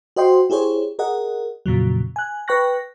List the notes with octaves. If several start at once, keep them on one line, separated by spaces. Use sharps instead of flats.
F#4 C5 D#5 G5 C6
E4 G4 G#4 C5 C#5
G#4 A#4 D#5 F#5
F2 A#2 C#3 F#3
G#5 F#6
B4 G5 C#6 F#6 A#6